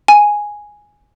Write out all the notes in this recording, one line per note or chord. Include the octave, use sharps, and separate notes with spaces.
G#5